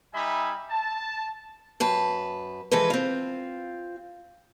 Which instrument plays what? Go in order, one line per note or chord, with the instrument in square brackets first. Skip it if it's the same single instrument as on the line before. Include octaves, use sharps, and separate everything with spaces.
[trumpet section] G3 D#4 E5 G#5 B5
A5
[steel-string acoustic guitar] F#2 B4 A5
E3 F3 G#3 A4 B4
C4 F4